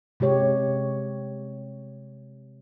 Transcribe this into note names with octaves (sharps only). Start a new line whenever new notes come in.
C3 G#3 G4 C#5